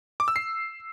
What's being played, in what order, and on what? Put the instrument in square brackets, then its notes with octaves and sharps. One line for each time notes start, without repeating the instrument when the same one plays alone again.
[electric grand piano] D6
E6
C7